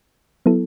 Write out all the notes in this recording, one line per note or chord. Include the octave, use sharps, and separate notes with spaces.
F#3 B3 E4 A4